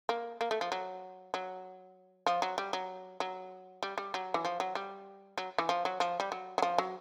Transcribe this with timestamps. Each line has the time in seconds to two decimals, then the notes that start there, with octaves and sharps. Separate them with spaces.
0.09 A#3
0.41 A#3
0.51 A3
0.61 F3
0.72 F#3
1.34 F#3
2.27 F3
2.42 F#3
2.58 G3
2.73 F#3
3.20 F#3
3.83 G3
3.98 G3
4.14 F#3
4.34 E3
4.45 F3
4.60 F#3
4.75 G3
5.38 F#3
5.58 E3
5.69 F3
5.85 F#3
6.00 F3
6.20 G3
6.32 F#3
6.58 F#3
6.62 F3
6.78 F#3